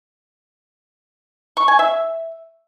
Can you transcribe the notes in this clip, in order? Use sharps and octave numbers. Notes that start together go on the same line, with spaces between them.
C#6
G#5
E5